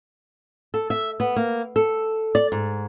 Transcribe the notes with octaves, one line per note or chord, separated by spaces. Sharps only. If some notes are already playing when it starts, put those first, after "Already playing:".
A4
E5
B3
A#3
A4
D5
G#2